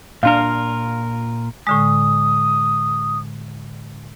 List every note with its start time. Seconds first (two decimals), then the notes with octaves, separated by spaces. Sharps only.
0.23 A#2 D4 F4 A#4 F5
1.67 A2 D3 G#3 D#6